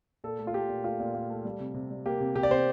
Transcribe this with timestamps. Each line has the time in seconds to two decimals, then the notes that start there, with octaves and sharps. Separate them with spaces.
0.24 A#2 A4
0.39 A3
0.47 F4
0.54 A3 G4
0.69 A#2
0.84 A3 F4
1.00 A#2
1.15 A#2
1.30 A3
1.45 G3
1.60 C3
1.74 C3
1.91 G3
2.06 A#3 G4
2.20 C3
2.35 C3 G4
2.43 D5
2.51 C3 C5